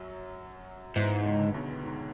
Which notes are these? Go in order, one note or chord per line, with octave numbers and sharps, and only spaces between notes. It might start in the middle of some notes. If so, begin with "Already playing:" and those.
Already playing: F#2 F#3
E2 G#2 E3
C#2 C#3
D3
C#3
B1 B2
G#2